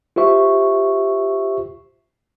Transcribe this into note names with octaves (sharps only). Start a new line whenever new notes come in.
F4 G4 C5 E5 C#6